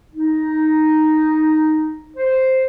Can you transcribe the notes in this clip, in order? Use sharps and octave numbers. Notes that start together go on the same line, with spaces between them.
D#4
C5